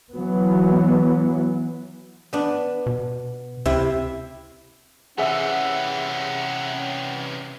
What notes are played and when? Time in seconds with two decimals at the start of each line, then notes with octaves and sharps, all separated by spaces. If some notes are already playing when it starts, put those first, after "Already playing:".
0.13 E3 F#3 B3
2.33 B3 D4
2.86 B2
3.66 D2 C3 E4
5.18 C3 E3 C#4 G#4 E5 F#5 E6